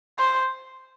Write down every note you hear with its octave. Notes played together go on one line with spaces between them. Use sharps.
C5